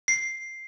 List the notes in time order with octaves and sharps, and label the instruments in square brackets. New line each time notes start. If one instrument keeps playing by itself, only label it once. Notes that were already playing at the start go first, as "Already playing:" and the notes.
[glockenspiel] C7